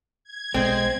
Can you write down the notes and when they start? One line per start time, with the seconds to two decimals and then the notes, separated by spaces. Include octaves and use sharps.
0.24 G#6
0.54 B1 B2 G#3 C4